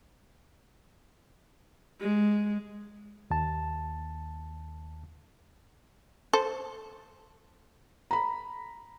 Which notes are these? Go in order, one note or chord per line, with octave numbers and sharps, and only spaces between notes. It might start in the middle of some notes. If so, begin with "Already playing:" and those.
G#3
D#2 A5
A4 C5
A#5 B5